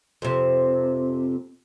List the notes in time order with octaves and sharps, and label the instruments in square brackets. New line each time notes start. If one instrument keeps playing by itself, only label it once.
[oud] F2 C3